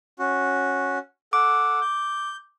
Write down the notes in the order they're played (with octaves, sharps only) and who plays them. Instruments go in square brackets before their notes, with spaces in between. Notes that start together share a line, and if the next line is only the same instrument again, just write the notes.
[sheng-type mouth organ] C#4 F#4
[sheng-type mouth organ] A4 F#5 [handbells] D6
[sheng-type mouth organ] G6